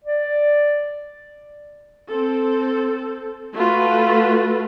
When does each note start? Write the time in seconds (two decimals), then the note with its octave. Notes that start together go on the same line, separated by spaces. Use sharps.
0.04 D5
2.10 C4 A4
3.54 A3 F4 F#4 A4 B4